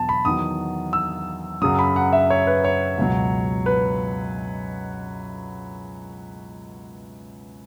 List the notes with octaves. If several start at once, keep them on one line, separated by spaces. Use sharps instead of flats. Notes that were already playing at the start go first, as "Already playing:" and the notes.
Already playing: E2 B2 F#3 A5
B5
E2 D#3 F#3 D#6
E6
F#2 C#3 F#3 D#6
B5
F#5
E5
C#5
B4
C#5
C#2 B2 F#3
B4